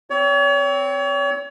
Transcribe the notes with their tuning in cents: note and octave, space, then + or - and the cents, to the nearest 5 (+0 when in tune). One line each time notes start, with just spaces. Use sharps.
C4 -5 C#5 +35